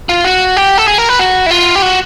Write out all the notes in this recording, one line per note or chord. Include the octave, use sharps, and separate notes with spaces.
F4
F#4
G4
A4
G#4
A#4
B4
F#4
E4
F4
G4
F#4